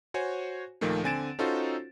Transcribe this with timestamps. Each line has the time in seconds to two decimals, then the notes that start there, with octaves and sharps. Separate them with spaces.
0.14 F#4 C5 C#5 G#5
0.81 D#2 A#2 D#3 F3 A3 A#3
1.04 D3 C4 G#5 A6 D7 E7
1.39 C#4 D#4 F4 F#4 A4 C5